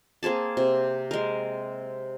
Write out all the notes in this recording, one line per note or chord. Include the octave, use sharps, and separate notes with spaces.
A#3 C4 G#4 A5
C3
G#3 A#4